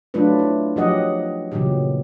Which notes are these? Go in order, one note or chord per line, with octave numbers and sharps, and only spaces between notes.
F#3 A3 D4 F4 B4
E4
F3 F#3 G4 D#5 F#5
A#2 C#3 E3 F#3 G4